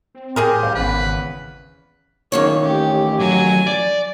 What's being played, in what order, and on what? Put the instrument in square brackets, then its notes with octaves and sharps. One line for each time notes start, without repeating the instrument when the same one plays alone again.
[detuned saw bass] C4
[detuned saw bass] A2 [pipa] C4 G#4 A#4 [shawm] G4
[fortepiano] C2 C5 F5
[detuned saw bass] G#1 [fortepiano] E2 C#3 [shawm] B4
[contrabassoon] F#1 [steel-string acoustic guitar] F2 D#3 C#5 [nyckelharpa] A#3
[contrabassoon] A1 [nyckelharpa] G4
[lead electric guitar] F#3 [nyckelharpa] G#5
[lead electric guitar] D5